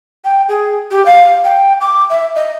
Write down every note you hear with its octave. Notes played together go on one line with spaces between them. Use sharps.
G5
G#4
G4
F5
G5
D6
E5
D#5